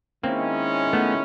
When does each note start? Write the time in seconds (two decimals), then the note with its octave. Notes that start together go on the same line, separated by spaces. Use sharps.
0.23 D#3 G#3 A#3 C4 C#4 E4
0.93 A3 B3